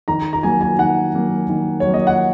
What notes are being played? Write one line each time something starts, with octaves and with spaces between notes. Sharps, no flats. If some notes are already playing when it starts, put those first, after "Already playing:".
D#3 A#5
A#5
F#3 A#3 G#5
G#5
D#3 F#5
F#3 A#3
D#3
F#3 C#5
A#3 D#5
F#5